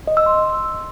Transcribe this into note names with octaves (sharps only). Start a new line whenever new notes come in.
D#5
E6
C6